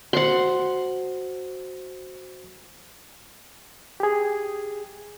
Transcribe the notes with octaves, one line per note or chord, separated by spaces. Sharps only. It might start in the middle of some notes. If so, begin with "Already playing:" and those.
F#4 C5 F#5 C6
G4 G#4